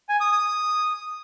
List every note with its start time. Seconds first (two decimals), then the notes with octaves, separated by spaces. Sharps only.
0.09 G#5
0.20 D#6
0.32 D#6